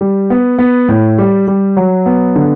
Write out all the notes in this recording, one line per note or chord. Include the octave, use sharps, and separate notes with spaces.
G3
B3
B3
A2
G3
G3
F#3
B3
D3